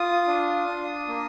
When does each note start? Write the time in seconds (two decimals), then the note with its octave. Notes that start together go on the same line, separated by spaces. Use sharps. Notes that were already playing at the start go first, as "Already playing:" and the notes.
Already playing: F4 D#6
0.27 D4
0.67 D4
1.08 A#3